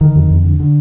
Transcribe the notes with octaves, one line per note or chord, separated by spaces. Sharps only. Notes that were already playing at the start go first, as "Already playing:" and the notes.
D3 D#3
F2
F2
D3
D3